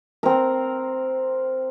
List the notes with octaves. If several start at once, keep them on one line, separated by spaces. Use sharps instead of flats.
C4 A#4